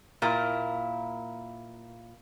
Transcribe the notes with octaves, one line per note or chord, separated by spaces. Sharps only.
A#2 A#3 E4